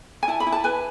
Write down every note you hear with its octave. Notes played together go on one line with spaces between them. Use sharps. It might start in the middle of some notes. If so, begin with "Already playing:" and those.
G#5
E4 A5
B5
E4
A5
B4 G#5